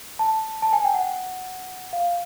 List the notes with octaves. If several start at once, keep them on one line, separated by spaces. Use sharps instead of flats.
A5
A5
G#5
G5
F#5
F5